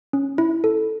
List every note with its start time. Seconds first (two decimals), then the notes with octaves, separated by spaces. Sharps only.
0.13 C#4
0.38 E4
0.64 A4